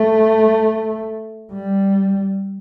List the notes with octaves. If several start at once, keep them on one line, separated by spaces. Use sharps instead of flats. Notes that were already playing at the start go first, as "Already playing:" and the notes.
Already playing: A3
G3